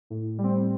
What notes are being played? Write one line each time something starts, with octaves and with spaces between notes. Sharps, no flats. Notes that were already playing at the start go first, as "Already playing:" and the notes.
A2
G3
C4